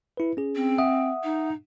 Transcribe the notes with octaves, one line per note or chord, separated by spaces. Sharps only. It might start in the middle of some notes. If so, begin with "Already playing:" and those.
E4 B4
C#4 G#4
C4
E5 F#5 D#6
D#4